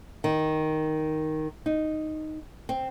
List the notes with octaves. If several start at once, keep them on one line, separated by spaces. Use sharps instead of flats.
D#3
D#4
C4